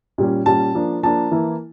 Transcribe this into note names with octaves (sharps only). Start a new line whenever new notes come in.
A#2 G3 C#4
A#2 G3 C#4 A5
F3 A#3 D4
F3 A#3 D4 A5
E3 A#3 E4